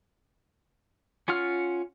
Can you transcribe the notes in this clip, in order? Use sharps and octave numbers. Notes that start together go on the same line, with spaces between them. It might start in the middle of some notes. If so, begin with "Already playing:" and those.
C#4 F4 F#5 F6